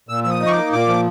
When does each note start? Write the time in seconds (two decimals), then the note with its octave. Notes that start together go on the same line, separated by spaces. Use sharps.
0.09 A#2 E6
0.24 F3 E6
0.30 D#6
0.40 D#4
0.46 C#6
0.52 D6
0.57 A#3
0.72 A#2 D6
0.88 F3